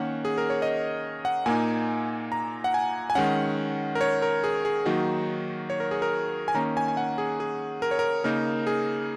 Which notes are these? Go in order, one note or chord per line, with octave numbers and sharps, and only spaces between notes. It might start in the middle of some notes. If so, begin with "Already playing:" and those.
Already playing: D#3 A#3 C#4 F#5
G#4
A#4
C#5
D#5
F#5
A#2 A#3 D#4 G#5
A#5
F#5
G#5
G#5
D#3 G#3 C#4 F#5
A#4
C#5
A#4
G#4
G#4
D#3 F#3 A#3 D#4 F#4
C#5
A#4
G#4
A#4
G#5
D#3 A#3 C#4 A#5
G#5
G#5
F#5
G#4
G#4
A#4
C#5
A#4
C#3 A#3 D#4 A#4
G#4